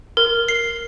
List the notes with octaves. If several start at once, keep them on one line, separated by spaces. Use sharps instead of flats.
A#4
C7